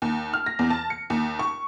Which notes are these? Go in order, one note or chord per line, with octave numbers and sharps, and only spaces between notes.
D#2
F6
A#6
E2
A5
C#7
D#2
C#6